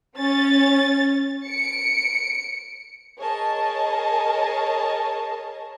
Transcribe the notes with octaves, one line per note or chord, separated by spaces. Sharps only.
C#4 A6
C#7 D7
G#4 A#4 C#5 D#5 A5